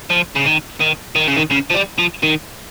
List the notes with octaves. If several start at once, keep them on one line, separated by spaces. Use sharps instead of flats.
F3
C#3
D#3
D#3
D#3
C#3
D#3
C#3
F3
G3
F3
D#3